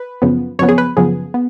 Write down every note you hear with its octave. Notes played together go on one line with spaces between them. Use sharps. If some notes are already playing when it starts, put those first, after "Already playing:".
Already playing: B4
F#2 C#3 F3 B3
F#2 C#3 F3 B3 C#5
G#4
B4
F#2 C#3 F3 B3 G#4
B3